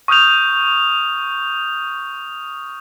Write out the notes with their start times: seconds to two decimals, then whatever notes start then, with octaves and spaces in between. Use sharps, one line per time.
0.08 C#6 D#6 F6 G6 F7